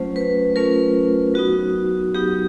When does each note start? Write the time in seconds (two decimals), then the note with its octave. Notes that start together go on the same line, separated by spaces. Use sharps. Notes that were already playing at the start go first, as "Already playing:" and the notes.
Already playing: F#3 A3 C#4 F4 C5
0.16 B4
0.56 F#3 A3 C#4 F4 A#4
1.34 F#3 B3 D#4 F#4
2.14 F#3 B3 D#4 G4